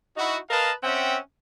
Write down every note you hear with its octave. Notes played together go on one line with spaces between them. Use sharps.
D#4 E4 F#4
A#4 B4 D#5 F5 A5
C4 C#4 E5 F#5 G5